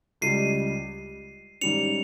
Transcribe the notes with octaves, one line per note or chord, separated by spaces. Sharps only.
C#2 C#3 G3 C7 D#7
G#2 D#3 G3 C#4 C#7 F7